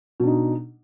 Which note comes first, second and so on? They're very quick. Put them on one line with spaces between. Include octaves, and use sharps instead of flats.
B2 D4 D#4